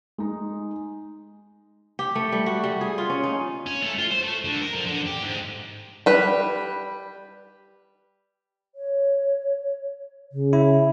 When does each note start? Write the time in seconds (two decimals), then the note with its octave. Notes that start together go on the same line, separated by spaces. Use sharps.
0.18 G#3 D#4
1.99 G4
2.15 A3
2.32 G3
2.46 F#4
2.64 G3
2.81 G#4
2.98 F4
3.10 C#4
3.24 D#4
3.67 C#4
3.82 A3
3.98 F4
4.11 C5
4.23 A3
4.45 D3
4.62 A#4
4.75 F3
4.87 D3
5.07 G4
5.24 G#2
6.06 G3 B4
8.75 C#5
10.32 C#3
10.53 E4